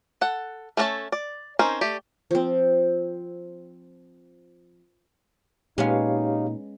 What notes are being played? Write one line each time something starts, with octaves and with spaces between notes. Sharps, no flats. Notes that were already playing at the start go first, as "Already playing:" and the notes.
A4 F#5
A3 C#4 D4 A4 A5
D5
C4 C#4 D#4 A#4 C5
A3 G4 D5
F3 C4
A#2 G#3 B3 C#4 D#4 G4 C#5 F5